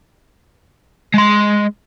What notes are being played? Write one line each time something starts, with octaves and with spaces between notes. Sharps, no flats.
G#3 C6